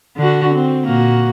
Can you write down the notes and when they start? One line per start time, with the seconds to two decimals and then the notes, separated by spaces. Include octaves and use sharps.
0.17 D3 D4 F#4
0.53 C4
0.86 A#2 A#3 F#4